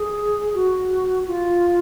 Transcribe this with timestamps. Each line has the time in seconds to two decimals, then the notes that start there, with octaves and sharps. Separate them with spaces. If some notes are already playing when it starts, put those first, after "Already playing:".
Already playing: G#4
0.54 F#4
1.27 F4